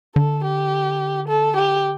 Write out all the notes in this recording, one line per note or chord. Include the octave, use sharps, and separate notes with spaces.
D3 A4
G4
A4
G4